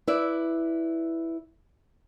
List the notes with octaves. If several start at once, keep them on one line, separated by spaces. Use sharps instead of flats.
E4 B4 D5 E5